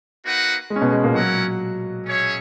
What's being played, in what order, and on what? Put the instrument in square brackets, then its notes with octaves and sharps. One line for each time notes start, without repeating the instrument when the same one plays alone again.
[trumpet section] A#3 D#4 F#4 B4 F#5
[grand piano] G#3
C#4
B2 B3
G#3
A#2 A#3
[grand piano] F#3 F#4 [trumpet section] C#4 E4 A#4 C#5 F#5
[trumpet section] C#4 G#4 C#5 E5